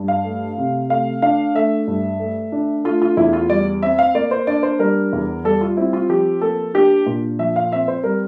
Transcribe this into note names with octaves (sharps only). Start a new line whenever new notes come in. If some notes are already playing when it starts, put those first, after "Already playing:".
Already playing: G2
F5
A3
C3
A3 F5
D4 F5
A3 E5
G2
A3
D4
A3 F4
F4
E2 E4
F4
G3 D5
C4 E5
F5
A#3 D5
C5
D4 D5
C5
G3 A#4
E2
G3 A4
F4
C4 E4
F4
F3 G4
A#3 A4
D4 G4
A#2
F3 E5
F5
C4 E5
C5
G3 A#4